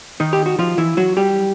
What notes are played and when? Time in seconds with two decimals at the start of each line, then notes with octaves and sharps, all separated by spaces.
0.20 D#3 D#4
0.33 G4
0.46 F#4
0.59 F3 F4
0.78 E3 E4
0.97 F#3 F#4
1.17 G3 G4